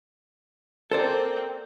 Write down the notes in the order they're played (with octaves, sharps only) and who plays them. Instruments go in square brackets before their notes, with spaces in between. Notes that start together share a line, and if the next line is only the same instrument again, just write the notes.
[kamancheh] A#3 C4 [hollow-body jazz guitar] A4 C5 D5